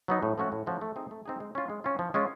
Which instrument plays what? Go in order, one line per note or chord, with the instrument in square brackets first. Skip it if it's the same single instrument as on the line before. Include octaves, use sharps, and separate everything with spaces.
[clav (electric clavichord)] F#3 B3 D#4
A2
F3 A3 C#4 F#4
A2
F3 A3 C#4 F#4
A3
C4 D#4 G#4
A3
C4 D#4 G#4
G#3
C#4 F4
G#3
C#4 F4
F3
G#3 C#4 F4